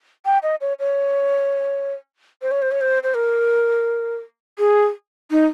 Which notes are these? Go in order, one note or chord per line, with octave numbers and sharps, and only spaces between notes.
G5
D#5
C#5
C#5
C5
C#5
C5
C#5
C5
C5
A#4
G#4
D#4